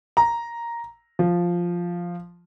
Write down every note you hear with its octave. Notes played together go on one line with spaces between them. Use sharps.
A#5
F3